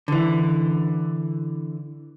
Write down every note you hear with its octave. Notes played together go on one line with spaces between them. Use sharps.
D3 E3